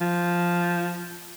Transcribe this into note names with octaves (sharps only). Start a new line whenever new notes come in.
F3